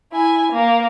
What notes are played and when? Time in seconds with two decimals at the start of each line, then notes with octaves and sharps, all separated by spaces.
0.12 E4 G#5
0.52 A#3